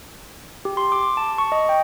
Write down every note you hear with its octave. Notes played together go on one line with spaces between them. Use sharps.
G4
C6
D6
A5
C#6
D#5
G5